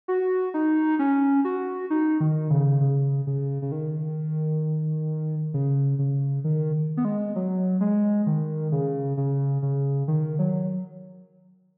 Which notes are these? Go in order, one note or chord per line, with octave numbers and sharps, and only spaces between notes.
F#4
D#4
C#4
F#4
D#4
D#3
C#3
C#3
C#3
C#3
D#3
C#3
C#3
D#3
B3
G#3
F#3
G#3
D#3
C#3
C#3
C#3
D#3
F#3